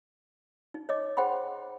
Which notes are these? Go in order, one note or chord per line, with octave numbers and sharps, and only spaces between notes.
D#4
C#5 D#5 D6
G#4 C5 F#5 G5 B5 C6